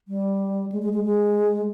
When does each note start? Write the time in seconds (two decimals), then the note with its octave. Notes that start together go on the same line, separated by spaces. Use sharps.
0.08 G3
0.72 G#3
0.82 G#3
0.93 G#3
1.04 G#3